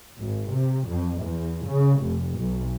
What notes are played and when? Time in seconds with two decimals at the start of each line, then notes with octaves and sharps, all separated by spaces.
0.20 G#1
0.51 C3
0.87 F2
1.21 E2
1.68 C#3
2.02 F1
2.38 B1